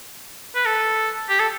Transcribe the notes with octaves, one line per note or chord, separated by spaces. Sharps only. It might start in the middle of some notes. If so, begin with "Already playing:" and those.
B4
A4
G4
A4